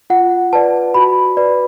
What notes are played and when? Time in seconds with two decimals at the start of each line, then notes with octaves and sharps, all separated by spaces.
0.10 F4 F#5
0.53 B4 D5 A5
0.94 F#4 B5
1.37 B4 D5